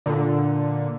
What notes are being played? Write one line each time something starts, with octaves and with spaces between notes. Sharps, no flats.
A#2 D3